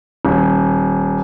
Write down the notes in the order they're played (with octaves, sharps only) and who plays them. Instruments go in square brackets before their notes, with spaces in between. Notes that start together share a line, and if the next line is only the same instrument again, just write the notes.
[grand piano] D#1